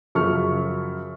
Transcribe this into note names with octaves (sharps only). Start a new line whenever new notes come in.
F#2 C#3 F3 C#6 F6